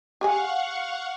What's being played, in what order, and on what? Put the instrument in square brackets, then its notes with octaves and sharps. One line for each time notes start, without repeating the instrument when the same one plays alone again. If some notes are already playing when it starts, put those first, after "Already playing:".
[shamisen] G4 G#4 G#5 [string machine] F5 F#5 C#6